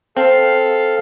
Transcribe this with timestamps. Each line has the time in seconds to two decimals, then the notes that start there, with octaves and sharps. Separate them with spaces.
0.17 C4 A4 F5